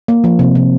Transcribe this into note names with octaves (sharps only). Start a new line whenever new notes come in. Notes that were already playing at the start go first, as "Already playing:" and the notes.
A#3
F3
C3
C3